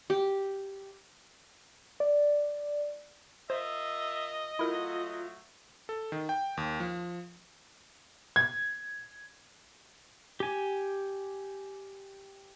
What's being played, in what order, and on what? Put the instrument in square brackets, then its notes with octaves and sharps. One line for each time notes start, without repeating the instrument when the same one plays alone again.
[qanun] G4
[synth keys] D5
[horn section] F4 A#4 E5 [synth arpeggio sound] C5 [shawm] D#5
[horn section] F#3 A3 [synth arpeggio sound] E4 A#4 [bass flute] F4
[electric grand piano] A4
D#3
G5
D#2
F3
[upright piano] G#6
[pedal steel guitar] G4 G#5